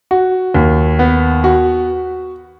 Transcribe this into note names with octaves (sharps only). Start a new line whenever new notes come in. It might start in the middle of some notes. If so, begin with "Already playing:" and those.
F#4
D#2
B3
F#4